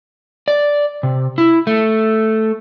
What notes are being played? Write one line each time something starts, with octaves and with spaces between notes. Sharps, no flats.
D5
C3
E4
A3